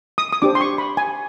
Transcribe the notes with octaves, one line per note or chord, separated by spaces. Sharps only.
D#6
D#6
D4 G4 C5 D6
C6
C#6
B5
G#5